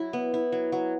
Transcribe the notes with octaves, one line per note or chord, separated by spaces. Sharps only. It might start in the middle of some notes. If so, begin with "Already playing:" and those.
Already playing: F#3 E4
B3
E4
F#3
F#3